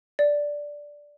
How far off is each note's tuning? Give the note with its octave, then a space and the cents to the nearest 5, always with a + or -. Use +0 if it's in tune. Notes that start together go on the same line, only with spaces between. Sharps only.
D5 -5